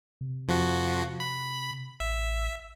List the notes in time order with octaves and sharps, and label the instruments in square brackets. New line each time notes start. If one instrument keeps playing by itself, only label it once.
[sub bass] C3
[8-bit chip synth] F2 F3 F#4
B5
[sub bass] A1 [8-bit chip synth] E5